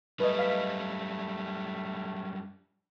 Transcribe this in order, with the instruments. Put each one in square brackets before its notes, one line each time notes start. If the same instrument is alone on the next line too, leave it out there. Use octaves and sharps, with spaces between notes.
[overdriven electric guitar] F#2 G3 [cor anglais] A3 [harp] B4 D#5
[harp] F5 B6 E7